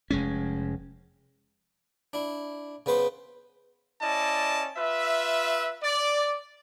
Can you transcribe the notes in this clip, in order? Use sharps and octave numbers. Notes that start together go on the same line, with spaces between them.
F1 G#3 C#4
D4 E4
C#3 B3 B4 C5
C#4 E4 D5 D#5 A5
F4 B4 E5
D5